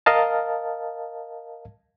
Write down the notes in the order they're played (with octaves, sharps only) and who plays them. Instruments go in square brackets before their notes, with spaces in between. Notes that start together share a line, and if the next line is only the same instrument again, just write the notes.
[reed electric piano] A#4 D#5 F5 A5